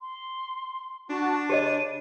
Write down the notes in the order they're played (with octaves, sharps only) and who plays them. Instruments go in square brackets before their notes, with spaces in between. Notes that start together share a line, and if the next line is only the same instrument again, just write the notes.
[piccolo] C6
[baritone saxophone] D4 [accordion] F#4 A5
[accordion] C#3 [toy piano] G4 C#5 D#5 [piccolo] D#7